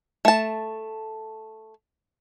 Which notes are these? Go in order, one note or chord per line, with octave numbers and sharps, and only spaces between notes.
A3 A5